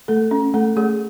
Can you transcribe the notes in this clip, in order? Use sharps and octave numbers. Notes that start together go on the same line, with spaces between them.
A3 A4
C#4
A3 A4
A3 G#4